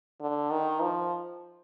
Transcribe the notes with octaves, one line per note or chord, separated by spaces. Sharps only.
D3
D#3
F3